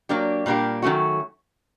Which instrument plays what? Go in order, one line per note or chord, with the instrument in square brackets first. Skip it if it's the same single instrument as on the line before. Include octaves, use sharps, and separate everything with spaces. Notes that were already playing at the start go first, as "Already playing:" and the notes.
[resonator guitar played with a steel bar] F#3 A#3 D4 G4
A#2 G3 A#3 D4 G4
D#3 F#3 A3 C#4 F#4